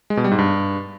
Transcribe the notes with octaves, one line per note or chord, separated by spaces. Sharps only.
G#3
B2
G3
G#2
G2